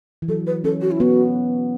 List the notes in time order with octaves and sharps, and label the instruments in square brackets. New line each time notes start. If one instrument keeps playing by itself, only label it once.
[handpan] E3
[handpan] F#3 [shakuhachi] A4
[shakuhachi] B4
[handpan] C#4 [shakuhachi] A4
[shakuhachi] F#4
E4
[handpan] B3 [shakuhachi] F#4